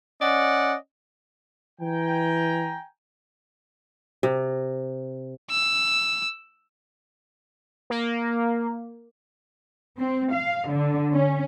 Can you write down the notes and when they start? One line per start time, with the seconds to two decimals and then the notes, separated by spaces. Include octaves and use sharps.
0.21 C#4 D5 D#5 F#5
1.81 E3 G5 G#5 A#5
4.23 C3
5.51 E6
7.90 A#3
10.00 C4
10.32 F5
10.69 D3
11.12 C#4